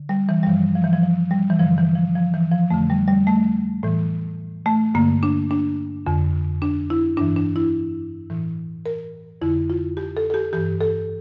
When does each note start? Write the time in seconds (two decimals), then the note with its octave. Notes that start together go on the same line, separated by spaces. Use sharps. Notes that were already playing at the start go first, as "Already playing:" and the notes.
Already playing: D3
0.09 G3
0.29 E3
0.43 G3
0.47 G2 E3 F3
0.75 F3
0.84 E3
0.93 F3
1.03 F3
1.31 G3
1.50 E3
1.59 G2 D3 F3
1.78 E3
1.96 F3
2.15 F3
2.34 E3
2.52 F3
2.70 F2 D3 A3
2.90 G3
3.08 G3
3.27 A3
3.83 A2 E3
4.66 A3
4.95 G2 D3 A#3
5.23 D4
5.51 D4
6.07 F2 D3
6.62 D4
6.90 E4
7.17 G2 E3 D4
7.36 D4
7.56 E4
8.30 A2 E3
8.86 A#4
9.42 F2 D3 E4
9.70 F4
9.97 G4
10.17 A4
10.30 A4
10.34 G4
10.53 G2 E3 G4
10.81 A4